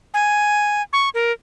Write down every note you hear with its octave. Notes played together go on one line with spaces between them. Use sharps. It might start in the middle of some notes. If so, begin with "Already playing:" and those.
G#5
C#6
A#4